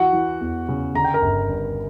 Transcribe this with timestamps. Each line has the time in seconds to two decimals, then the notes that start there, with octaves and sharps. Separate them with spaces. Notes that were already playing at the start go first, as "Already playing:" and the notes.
Already playing: E3 F#4 F#5
0.13 E3
0.41 E2
0.69 C#3
0.95 D3 A#5
1.04 G5
1.14 A#4 A#5
1.22 G1
1.49 G2